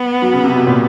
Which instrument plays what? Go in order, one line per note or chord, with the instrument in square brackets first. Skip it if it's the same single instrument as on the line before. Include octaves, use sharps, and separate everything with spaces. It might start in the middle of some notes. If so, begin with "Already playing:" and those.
Already playing: [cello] B3
[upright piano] F#3
C#3
C3
B2
A#2